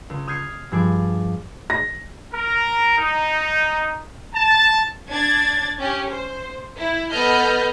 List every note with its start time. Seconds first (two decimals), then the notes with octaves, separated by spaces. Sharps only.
0.10 C#2
0.27 D#6 F6 G6 G#6 C7 C#7
0.72 G2 F3 G#4 D5
1.70 A#6
2.33 A#4
2.98 D#4
4.34 A5
5.09 D4 G#6 A6
5.79 C#4 G4
6.10 C5
6.77 E4
7.10 B3 A4 B4 D#5 F6 G6